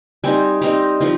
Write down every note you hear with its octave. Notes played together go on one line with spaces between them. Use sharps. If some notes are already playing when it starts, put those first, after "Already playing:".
G3 C4 D#4 G#5
G3 C4 D#4 A#5
F3 C4 D#4